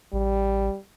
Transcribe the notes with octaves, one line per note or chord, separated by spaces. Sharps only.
A1 G3